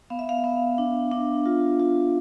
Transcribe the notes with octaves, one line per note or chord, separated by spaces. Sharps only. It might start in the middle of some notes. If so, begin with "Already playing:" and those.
B3 F5
E5
F5
B3
D4
D4
F4
F4